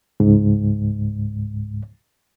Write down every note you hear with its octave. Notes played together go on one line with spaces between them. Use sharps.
C#2 G#2